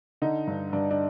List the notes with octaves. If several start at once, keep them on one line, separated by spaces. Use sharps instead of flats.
D3 D#4
G2
G2 D4
D4